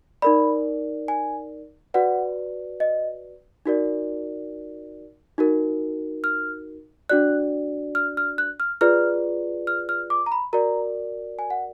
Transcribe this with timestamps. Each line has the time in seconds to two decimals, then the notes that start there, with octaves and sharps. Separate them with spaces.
0.22 D#4 A#4 D5 B5
1.08 G#5
1.94 F#4 B4 D5 F#5
2.80 D#5
3.66 D#4 F#4 A#4 D5
5.38 D#4 F#4 A#4
6.24 F6
7.09 D4 F#4 D5 F#6
7.95 F6
8.17 F6
8.38 F#6
8.60 F6
8.81 F4 G#4 B4 D5 F6
9.67 F6
9.89 F6
10.10 D6
10.26 A#5
10.32 B5
10.53 F#4 A#4 D5 A#5
11.39 G#5
11.50 F#5